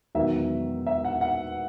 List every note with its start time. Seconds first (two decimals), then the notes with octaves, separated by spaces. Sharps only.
0.15 E1 E2 D#3 F#3 E5
0.87 E5
1.05 F#5
1.21 F#5